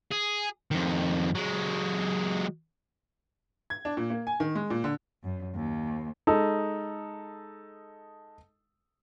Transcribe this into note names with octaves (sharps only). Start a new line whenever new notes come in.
G#4
F2 D#3
F#3 G#3
G#6
D4
A#2
A#3
G#5
D#3
G#3
A#2
D3
F#2
D#2
G#3 D#4 A4